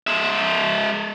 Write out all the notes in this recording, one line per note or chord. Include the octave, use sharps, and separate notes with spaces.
G#3 E5